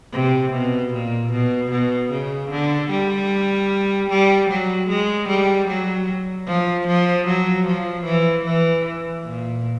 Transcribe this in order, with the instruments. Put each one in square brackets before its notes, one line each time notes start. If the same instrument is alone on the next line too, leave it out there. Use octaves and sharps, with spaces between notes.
[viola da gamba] C3
B2
A#2
B2
B2
C#3
D3
G3
G3
F#3
G#3
G3
F#3
F3
F3
F#3
F3
E3
E3
A#2